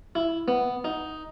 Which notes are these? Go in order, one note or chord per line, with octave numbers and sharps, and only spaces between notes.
E4
B3
D#4